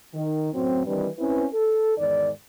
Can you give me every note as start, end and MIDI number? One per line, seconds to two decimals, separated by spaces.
0.13 0.51 51
0.53 0.84 42
0.53 0.84 45
0.53 0.84 54
0.53 0.84 60
0.86 1.08 51
0.86 1.08 52
0.86 1.08 55
0.86 1.08 60
0.86 1.08 62
0.86 1.08 71
1.18 1.45 60
1.18 1.45 61
1.18 1.45 64
1.18 1.45 71
1.53 1.94 69
1.98 2.30 40
1.98 2.30 44
1.98 2.30 51
1.98 2.30 74